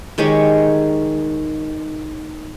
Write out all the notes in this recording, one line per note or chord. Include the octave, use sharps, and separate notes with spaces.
D#3 G#3 G4 C#5